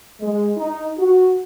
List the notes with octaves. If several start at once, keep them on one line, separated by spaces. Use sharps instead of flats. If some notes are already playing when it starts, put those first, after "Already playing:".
G#3
D#4
F#4